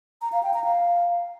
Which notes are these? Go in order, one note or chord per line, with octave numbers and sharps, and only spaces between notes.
A#5
F5
G5
A#5
F5